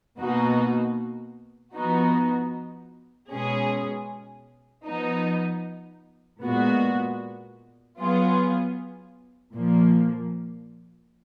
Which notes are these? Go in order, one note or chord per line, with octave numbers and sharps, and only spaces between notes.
B2 A#3 D#4 F#4
F3 B3 D#4 F#4
B2 G#3 C#4 G#4
F3 B3 D#4
A#2 G#3 B3 F#4
F#3 B3 F4 G#4
A#2 F3 A#3